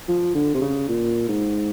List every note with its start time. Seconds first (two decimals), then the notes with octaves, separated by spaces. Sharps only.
0.09 F3
0.35 D3
0.54 C3
0.61 C#3
0.88 A#2
1.29 G#2